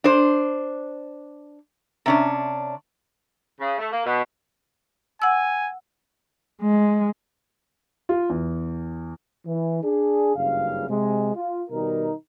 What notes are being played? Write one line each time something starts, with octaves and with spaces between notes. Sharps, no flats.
D4 C5
C3 C#4 D4
C#3
A3
A#3
B2
F#5 G#5 E6
G#3
F4
E2
E3
D4 G#4
F#1 G2 C#3 F5
C3 G#3
F4
B2 D#3 G3 D#4 A#4